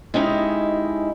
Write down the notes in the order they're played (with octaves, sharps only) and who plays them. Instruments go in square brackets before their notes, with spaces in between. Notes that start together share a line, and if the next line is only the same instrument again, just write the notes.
[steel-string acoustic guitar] G#3 C#4 D#4 E4 G4